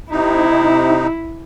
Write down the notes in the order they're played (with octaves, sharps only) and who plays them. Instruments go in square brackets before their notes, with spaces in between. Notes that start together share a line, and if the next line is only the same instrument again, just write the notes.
[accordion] C3 D#4 [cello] E4